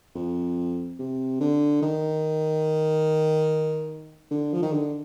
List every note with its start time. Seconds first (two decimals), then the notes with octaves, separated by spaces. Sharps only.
0.16 F2
0.99 C3
1.41 D3
1.82 D#3
4.31 D3
4.53 F3
4.63 D#3
4.73 D3